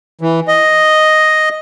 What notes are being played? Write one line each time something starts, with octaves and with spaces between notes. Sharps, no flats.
E3
D#5